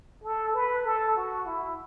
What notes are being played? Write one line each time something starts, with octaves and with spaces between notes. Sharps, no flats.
A4
B4
A4
F#4
E4